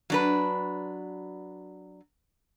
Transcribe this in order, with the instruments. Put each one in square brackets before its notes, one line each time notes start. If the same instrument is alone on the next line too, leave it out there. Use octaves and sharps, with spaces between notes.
[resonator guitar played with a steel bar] F#3 D4 B4